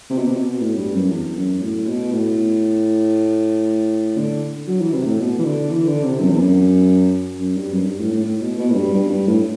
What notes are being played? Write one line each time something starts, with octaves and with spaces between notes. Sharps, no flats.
C3
B2
C3
B2
A2
G2
F#2
E2
F#2
A2
B2
A2
D3
F#3
E3
C3
A2
B2
E3
D3
E3
D3
C3
F#2
E2
F#2
F#2
G2
F#2
G2
A2
A2
A2
B2
B2
A2
G2
G2
G2
A2